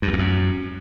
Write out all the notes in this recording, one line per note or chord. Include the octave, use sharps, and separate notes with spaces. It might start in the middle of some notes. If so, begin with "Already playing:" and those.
G2
E2
F2
F#2